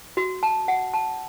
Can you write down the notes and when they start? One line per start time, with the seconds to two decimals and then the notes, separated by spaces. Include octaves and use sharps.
0.17 F#4
0.43 A5
0.68 F#5
0.94 A5